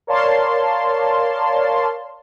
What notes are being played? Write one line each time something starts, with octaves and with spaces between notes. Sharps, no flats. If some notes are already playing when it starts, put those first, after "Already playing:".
A#4 C#5 D5 F5 A5 C6